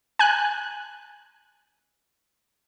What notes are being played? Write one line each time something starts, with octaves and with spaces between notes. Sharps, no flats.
G#5 F#6